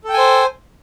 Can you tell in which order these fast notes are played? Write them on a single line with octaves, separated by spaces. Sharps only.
A4 G5 G#5 C5